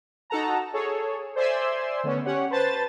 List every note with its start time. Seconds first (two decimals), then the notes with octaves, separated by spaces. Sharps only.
0.30 D#4 F#4 A4 F#5 A5 A#5
0.73 G#4 A4 C#5
1.36 C5 D5 E5 G#5 C6 E6
2.04 D3 A3 B3 C#4
2.26 C#4 G4 C#5 F#5
2.51 B4 C5 A5 A6